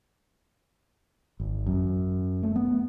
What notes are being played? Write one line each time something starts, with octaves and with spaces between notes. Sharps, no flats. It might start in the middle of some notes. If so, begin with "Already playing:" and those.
G#1
F#2
A3
B3